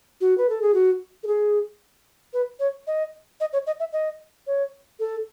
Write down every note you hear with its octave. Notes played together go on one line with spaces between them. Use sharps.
F#4
B4
A4
G#4
F#4
A4
G#4
B4
C#5
D#5
D#5
C#5
D#5
E5
D#5
C#5
A4